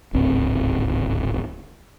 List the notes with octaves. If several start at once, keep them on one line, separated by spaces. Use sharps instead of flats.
D1 G#1 C#2 C4